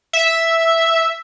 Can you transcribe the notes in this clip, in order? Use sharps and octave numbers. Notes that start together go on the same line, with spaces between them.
E5